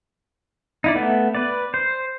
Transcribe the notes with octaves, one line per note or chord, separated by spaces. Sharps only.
D#4 E4 D5
A3 B3
B4 D5
C5